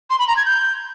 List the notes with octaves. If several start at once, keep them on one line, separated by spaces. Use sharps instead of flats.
C6
B5
A#5
G#6
G6